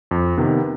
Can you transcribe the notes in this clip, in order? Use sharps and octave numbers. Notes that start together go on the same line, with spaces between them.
F2
C3 D#3 B3